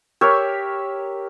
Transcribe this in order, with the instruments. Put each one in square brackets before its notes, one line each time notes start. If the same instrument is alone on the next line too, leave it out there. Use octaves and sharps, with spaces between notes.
[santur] G4 A#4 C#5 E5